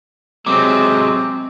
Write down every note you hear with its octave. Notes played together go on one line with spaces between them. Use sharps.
C3 F#3 G#3 C4 D6